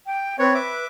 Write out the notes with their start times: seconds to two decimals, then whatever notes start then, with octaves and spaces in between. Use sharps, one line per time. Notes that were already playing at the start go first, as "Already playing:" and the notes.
0.06 G5
0.39 C4 B4 C#5
0.54 E5 D6